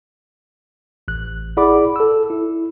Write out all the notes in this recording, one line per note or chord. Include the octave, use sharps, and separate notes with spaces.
A1 F#6
E4 G#4 D5 F#5 B5 D6
A4 E6
E4